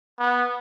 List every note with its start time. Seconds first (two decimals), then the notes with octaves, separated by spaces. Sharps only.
0.19 B3